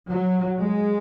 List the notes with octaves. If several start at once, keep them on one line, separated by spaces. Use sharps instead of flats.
F#3
G#3